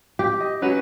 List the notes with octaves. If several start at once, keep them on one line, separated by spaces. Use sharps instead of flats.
G4
D#5
F#3 C#4 F#4 B4